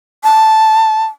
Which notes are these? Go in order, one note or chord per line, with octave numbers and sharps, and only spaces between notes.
A5